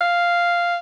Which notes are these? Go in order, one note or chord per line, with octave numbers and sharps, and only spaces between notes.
F5